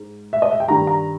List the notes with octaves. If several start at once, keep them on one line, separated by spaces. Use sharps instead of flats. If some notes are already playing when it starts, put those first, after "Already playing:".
Already playing: G#2
E5
D#5
E5
G5
G2 D#3 G3 A#5
A#5